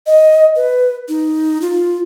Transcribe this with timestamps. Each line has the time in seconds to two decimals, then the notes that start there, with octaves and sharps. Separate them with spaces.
0.07 D#5
0.56 B4
1.09 D#4
1.61 F4